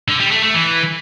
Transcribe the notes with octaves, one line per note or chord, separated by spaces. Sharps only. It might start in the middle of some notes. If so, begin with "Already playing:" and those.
D3
G3
A3
A3
E3